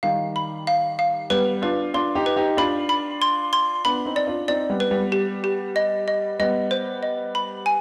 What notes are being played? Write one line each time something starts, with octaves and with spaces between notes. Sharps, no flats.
D#3 G3 F5
B5
F5
F5
G3 B3 B4
D4 F4 B4
D4 F4 C6
D#4 G4
B4
D#4 G4
D4 F4 B5
B5
C6
C6
B3 D4 B5
C4 D#4
D5
D4 F4
C4 D#4 D5
G3 B3
B4
G3 B3
G4
G4
D#5
D#5
G3 B3 D#5
C5
D#5
B5
G#5